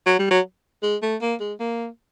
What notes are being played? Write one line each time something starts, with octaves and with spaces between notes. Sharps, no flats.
F#3
G3
F#3
G#3
A3
A#3
G#3
A#3